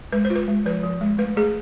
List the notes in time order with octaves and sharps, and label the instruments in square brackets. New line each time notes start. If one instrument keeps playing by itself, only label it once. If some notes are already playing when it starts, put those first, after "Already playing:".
[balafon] G#3 B4
C5
F4
B4
G#3
F3 B4
F3
G#3
A3 B4
A3 G#4